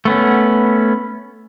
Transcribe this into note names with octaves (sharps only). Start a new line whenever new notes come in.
A3 B3 C#4